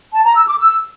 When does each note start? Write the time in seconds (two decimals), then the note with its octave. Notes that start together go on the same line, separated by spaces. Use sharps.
0.14 A5
0.25 A#5
0.36 E6
0.48 D6
0.59 E6